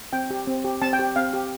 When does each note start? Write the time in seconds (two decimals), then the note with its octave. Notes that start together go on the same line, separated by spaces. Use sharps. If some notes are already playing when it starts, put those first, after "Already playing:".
0.13 C4 G5
0.30 G4
0.47 C4
0.65 G4
0.82 C4 A5
0.93 G5
0.99 G4
1.16 C4 F5
1.33 G4